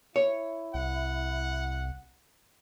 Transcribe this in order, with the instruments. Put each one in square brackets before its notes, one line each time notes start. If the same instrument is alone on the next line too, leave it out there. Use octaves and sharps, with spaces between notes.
[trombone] E4 [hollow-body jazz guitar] C#5
[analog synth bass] C2 [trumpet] F#5